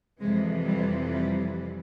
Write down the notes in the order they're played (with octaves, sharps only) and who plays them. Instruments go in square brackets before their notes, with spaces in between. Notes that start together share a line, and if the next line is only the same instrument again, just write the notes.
[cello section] F2 C3 E3 G#3
G3
G3